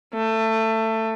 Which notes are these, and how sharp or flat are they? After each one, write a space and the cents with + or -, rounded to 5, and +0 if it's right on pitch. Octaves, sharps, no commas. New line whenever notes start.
A3 +20